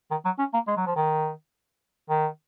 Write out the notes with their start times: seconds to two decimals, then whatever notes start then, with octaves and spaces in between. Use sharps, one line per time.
0.11 D#3
0.25 F#3
0.39 C#4
0.54 A#3
0.67 G#3
0.77 F#3
0.86 F3
0.96 D#3
2.10 D#3